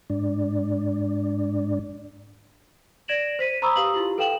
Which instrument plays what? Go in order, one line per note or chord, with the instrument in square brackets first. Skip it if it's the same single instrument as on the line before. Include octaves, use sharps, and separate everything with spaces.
[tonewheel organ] G#2 D4
[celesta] D5 G#6 A#6 D7 E7 F#7
C5 B6 D#7
C5 A#5 B5 C#6 D#6 E6
G4 B4 F5 D#6 F#7
E4 F4 G4
A4 B4 F5 G5 E7 F#7